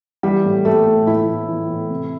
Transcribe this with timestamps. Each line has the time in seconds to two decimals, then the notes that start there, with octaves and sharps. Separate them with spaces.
0.23 E3 G3
0.45 A2
0.65 A2 A3
0.86 A2
1.07 E3 E4
1.28 A2
1.49 E3
1.69 A2
1.90 C3